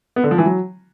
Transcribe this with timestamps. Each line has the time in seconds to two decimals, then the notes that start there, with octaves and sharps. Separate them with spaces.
0.16 B3
0.24 D3
0.31 F3
0.38 E3
0.46 F#3